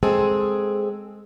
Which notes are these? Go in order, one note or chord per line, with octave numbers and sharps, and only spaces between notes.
G#3 C4 G#4 A4